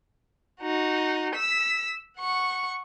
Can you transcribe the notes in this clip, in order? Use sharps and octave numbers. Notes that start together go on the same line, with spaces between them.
D#4 F#4
E6 B6
F#5 C#6